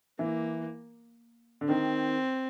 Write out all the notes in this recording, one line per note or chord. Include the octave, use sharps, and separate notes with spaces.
E3 A#3
D3
D#3 C4